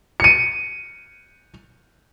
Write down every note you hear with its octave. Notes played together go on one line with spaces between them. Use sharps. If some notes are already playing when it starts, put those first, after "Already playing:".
C#7 D#7